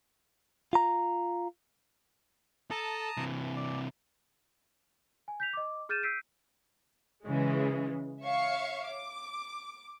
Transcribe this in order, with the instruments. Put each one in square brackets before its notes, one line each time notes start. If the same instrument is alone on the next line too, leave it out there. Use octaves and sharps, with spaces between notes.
[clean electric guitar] F4 A#5
[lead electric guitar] A4 [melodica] A5 A#5 D#6
[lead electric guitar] C3 E3
[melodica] D5
[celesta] G#5
G6 B6 F7
D#5 D6
G#4 F6 G6 A6 D#7 E7
E6 G6 B6 C7 D7 D#7
[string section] C#3 E3 G#3
C#5 E5 F5 C#6
D6